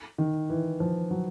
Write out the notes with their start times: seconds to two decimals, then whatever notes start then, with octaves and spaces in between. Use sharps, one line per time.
0.18 D#3
0.50 E3
0.80 F3
1.11 F#3